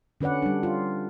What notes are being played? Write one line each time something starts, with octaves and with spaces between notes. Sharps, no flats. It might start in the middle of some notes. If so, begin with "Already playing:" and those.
D3 C#4 B4 D5 F#5
G3 D4
F4